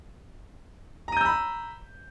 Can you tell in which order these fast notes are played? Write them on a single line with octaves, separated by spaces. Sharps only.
A#5 D#7 G6 E6 B5